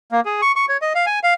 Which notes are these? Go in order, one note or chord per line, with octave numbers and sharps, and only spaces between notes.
A#3
G#4
C#6
C#6
C#5
D#5
F5
G#5
F5